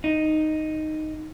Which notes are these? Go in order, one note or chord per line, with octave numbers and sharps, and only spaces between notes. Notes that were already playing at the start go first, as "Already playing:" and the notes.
D#4